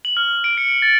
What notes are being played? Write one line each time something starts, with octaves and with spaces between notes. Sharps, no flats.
F#7
F6
D7
C#7
A6